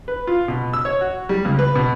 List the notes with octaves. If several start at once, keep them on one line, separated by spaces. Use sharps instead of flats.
B4
F4
B2
E6
C#5
F#4
G3
C#2
B4
B2